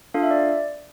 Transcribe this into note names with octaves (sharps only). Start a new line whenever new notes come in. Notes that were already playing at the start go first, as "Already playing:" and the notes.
D4 F4 A4 F5
E5
D5